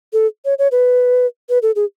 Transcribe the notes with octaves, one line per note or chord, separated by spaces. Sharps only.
A4
C#5
C#5
B4
B4
A4
G#4